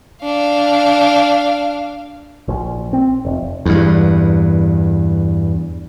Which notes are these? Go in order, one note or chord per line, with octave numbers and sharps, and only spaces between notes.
D4 F5
A#1
C4
F1
E2 G2